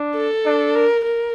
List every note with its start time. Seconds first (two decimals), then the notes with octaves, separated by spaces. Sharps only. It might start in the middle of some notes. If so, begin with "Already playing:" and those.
Already playing: D4
0.16 A4
0.46 D4
0.75 A#4
1.05 A#4